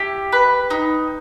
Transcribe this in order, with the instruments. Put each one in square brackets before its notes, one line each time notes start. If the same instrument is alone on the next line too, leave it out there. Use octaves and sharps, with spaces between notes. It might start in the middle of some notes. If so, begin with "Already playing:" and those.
Already playing: [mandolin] E4 G4
B4
D#4